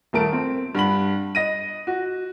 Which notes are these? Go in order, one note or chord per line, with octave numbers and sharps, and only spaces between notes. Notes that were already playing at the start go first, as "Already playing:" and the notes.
D#1 A3 A#4 A5 D7
C4
G2 F#5 B5 F#7
D#5 A#6 D#7
F#4